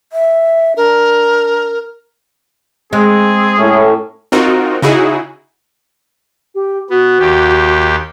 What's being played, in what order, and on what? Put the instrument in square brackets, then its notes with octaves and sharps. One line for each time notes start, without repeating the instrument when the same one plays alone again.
[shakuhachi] E5
[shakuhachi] D4 [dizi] A#4
[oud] G#3 [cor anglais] C4 [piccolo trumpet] G#4
[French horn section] A2 [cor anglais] C#4
[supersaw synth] C4 D#4 F4 F#4 A#4
C#3 D#4 E4 F#4 G#4
[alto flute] G4
[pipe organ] B3 [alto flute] F#4
[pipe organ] D#2 G4